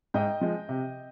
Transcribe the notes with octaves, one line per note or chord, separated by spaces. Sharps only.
G#2 D#5 G5
F3 G#3
C3